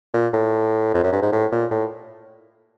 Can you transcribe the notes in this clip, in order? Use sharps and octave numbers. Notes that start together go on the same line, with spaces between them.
A#2
A2
F2
F#2
G2
G#2
A2
A#2
A2